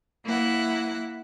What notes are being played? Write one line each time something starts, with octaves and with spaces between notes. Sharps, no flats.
A#3 E4 F#5